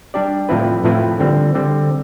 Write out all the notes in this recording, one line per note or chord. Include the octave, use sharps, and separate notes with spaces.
G3 D4 G4 D5
A2 F3 C4 E4 B4
A2 F3 C4 E4 B4
D3 G3 C4
D3 G3 C4